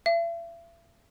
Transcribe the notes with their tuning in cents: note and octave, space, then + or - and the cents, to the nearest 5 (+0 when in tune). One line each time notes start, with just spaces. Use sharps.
E5 +40